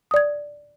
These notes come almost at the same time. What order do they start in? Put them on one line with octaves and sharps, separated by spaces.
D#6 D5 G#6